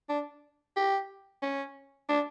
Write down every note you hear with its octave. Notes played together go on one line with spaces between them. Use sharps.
D4
G4
C#4
D4